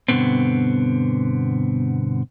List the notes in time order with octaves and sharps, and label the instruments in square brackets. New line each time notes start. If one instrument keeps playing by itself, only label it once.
[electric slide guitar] G2 B2 D3 B3 C4